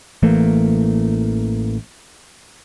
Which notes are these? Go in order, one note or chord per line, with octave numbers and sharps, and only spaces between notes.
A1 E3 A3 A#3